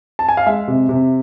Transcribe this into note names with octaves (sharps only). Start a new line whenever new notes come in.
A5
G#5
F5
G#3 E5
C3
C3